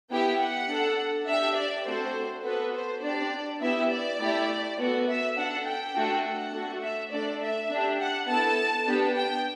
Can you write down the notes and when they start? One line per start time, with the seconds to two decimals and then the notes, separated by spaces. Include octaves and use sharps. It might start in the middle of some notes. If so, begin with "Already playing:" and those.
0.11 B3 E4 G4 G5
0.40 F#5
0.68 D4 A4
1.27 D4 G4 E5
1.56 D5
1.86 A3 C4 F#4 A4 C5
2.44 B3 F#4 A4 B4
2.74 C5
3.03 D4 G4 D5
3.61 B3 E4 G4 E5
3.90 D5
4.20 A3 E4 G4
4.78 B3 F#4 A4
5.08 E5
5.37 D4 A4 F#5
5.65 G5
5.95 A3 D4 F#4 A4
6.24 F#5
6.53 A3 D4 F#4 A4
6.82 E5
7.12 A3 D4 A4 D5
7.41 E5
7.70 D4 G4
7.99 F#5
8.28 B3 E4 A4 A5
8.87 B3 D4 G4
9.16 G5